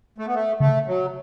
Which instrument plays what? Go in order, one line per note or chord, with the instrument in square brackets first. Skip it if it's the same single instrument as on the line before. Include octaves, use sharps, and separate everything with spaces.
[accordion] A3
B3
A3
[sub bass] C#3 [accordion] A3
[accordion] F#3